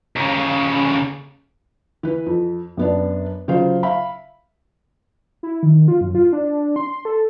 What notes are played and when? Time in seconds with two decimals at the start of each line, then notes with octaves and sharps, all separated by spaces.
0.16 D#2 C#3
2.03 E3 B4
2.26 F2
2.77 F#2 B3 D4
3.48 C#3 F#3 F4 C5
3.83 E5 F5 B5
5.43 E4
5.63 D#3
5.88 F4
6.01 F#2
6.15 F4
6.33 D4
6.76 C6
7.05 A4